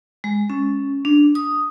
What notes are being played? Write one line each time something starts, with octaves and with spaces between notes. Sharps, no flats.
G#3
C#4
D4
D#6